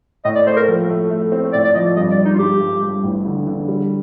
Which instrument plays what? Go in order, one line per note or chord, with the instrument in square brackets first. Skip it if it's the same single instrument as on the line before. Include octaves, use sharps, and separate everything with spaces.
[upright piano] A2 [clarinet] D#5
[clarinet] D5
[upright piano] A3 [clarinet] C5
[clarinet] A#4
[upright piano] F3
A3
A3
C4
[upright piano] A2 [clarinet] D5
[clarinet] D5
[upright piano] F3 [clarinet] D#5
[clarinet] D5
[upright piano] G2 [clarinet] D#5
[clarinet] D5
[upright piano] G2
[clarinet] D#4
F4
[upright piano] G2 [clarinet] G4
[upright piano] G2
G2
A1
D3
D3
G3